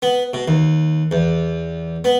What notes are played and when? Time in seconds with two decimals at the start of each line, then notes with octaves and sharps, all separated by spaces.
0.02 B3
0.33 B2
0.48 D#2
1.11 E2
2.04 B3